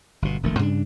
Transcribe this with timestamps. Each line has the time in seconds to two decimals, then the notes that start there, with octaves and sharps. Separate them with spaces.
0.22 G1 B2
0.43 E1 A#1 D#3 A3
0.59 G2 C#3 C4 D4